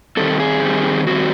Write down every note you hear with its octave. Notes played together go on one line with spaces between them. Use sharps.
D#3 G3 C4 A4
G#4
D#3 G3 C4
D#3 G3 C4 F#4